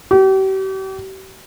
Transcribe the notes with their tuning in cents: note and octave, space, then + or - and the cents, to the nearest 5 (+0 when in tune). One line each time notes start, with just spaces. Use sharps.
G4 -40